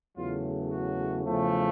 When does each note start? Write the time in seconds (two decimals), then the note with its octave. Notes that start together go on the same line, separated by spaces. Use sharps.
0.16 E2 C#3 F#3 A3 F4
0.71 F#4
1.25 E2 C#3 F3 A3